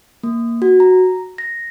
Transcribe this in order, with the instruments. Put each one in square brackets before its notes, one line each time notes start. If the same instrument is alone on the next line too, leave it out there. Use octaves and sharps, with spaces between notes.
[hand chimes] A#3
F#4
A#5
A#6